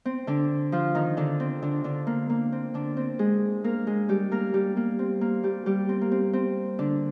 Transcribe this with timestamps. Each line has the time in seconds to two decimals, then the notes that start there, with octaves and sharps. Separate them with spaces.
0.05 C4
0.27 D3 D4
0.72 F3 F4
0.95 D#3 D#4
1.17 D3 D4
1.40 C4
1.62 D3 D4
1.84 D3 D4
2.07 A#3
2.30 A#3
2.52 C4
2.74 D3 D4
2.97 C4
3.19 G#3 G#4
3.64 A#3 A#4
3.87 G#3 G#4
4.09 G3 G4
4.31 A#3 A#4
4.54 G3 G4
4.77 A#3
4.99 C4
5.21 A#3
5.43 G3 G4
5.66 G3 G4
5.89 C4
6.02 A#3
6.11 C4
6.33 C4
6.79 D3 D4